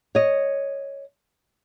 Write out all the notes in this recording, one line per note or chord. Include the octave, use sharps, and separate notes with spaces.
C#5 D#5